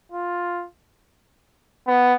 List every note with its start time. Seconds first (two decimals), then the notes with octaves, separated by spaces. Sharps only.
0.12 F4
1.87 B3